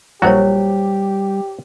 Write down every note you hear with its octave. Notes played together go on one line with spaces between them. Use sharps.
A#1 F#3 G3 E4 F#4 G4 C5 C#5